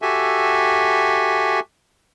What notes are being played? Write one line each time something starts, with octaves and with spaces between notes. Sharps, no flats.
F#4 G4 A4 E5 G#5